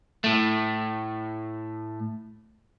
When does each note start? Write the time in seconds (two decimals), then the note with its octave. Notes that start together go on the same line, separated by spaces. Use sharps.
0.24 A2 A3